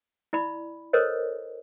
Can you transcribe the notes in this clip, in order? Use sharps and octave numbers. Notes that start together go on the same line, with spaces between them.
E4 D5 B5
A4 A#4 C5 C#5 D#5